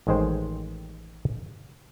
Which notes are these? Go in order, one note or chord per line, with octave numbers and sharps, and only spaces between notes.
A1 D#3 G#3 C5 G5